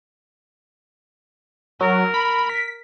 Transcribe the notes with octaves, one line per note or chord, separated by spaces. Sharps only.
F#3 A#4
B5
B6